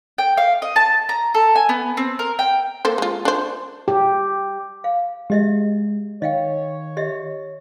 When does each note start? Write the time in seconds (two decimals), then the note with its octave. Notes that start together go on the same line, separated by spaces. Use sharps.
0.18 G5
0.38 F5
0.62 D#5
0.76 A5
1.09 A#5
1.35 A4
1.56 G#5
1.69 B3
1.97 C4
2.19 A#4
2.39 G5
2.85 A#3 A4 C5
2.98 G#3 F4
3.25 D4 C5
3.88 G4
4.84 F5
5.30 G#3 G4 D#5 E5
6.22 D#3 C#5 D#5 F5 G5
6.97 G4 D#5 E5